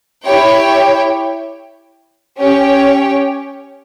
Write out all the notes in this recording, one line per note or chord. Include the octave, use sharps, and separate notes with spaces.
E4 G4 C#5 G5
C#4 G4 C#5 G5